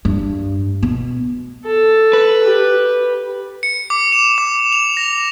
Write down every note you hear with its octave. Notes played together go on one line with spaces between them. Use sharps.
G2
B2
A4
B4
G4
C#7
D6
E7
D6
F7
A#6